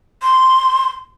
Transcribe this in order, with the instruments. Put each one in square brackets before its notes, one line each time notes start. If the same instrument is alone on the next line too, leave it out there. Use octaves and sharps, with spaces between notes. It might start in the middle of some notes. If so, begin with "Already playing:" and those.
[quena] C6